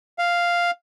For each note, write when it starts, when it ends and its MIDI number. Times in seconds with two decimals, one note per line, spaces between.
0.19 0.71 77